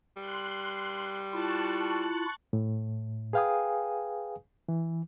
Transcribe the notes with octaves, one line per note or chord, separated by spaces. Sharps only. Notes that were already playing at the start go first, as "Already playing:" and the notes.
G3 C6 F#6
E4 F4 A5 C#6 F#6
A2
G#4 B4 F5 G5 G#5 D#6
E3